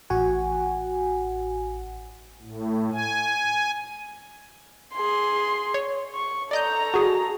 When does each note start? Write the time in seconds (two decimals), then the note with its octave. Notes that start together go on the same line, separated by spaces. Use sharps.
0.10 A1 F#4 F#5 G#5
2.41 A2
2.92 G#5
4.94 G#4 C6
5.74 C#5
6.14 C#6
6.51 A4 D5 D#5 A#5 G6
6.94 F#4 G#4